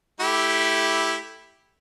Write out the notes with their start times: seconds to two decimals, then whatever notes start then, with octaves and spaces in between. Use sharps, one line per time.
0.20 A3 E4 G4